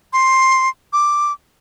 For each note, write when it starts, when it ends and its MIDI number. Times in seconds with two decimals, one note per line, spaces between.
0.13 0.69 84
0.93 1.32 86